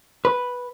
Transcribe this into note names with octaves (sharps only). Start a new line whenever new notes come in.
B4